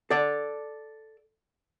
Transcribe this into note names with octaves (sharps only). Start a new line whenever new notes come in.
A4 D5